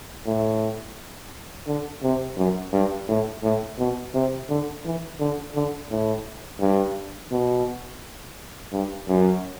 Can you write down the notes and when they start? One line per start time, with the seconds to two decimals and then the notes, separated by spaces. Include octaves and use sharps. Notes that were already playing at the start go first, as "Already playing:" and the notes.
0.26 A2
1.67 D3
2.03 C3
2.37 F#2
2.73 G2
3.08 A2
3.44 A2
3.79 B2
4.15 C3
4.49 D3
4.85 E3
5.19 D3
5.55 D3
5.91 A2
6.61 G2
7.32 B2
8.72 G2
9.08 F#2